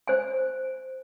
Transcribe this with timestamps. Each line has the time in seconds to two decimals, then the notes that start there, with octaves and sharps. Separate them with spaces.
0.07 C5 G#5